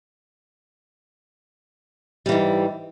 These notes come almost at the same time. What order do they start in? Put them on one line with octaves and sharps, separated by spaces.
G3 E3 G#2